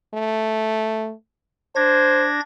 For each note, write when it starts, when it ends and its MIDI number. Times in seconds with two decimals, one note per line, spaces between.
0.14 1.12 57
1.76 2.40 62
1.76 2.27 72
1.76 2.40 92
1.76 2.40 94